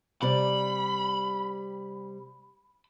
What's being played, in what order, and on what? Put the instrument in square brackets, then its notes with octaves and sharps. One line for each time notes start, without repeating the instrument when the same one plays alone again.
[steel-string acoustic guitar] C3 G3 D5 [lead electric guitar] B5